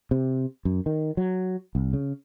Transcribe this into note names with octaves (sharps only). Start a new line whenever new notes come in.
C3
F#2
D#3
F#3
C2
C#3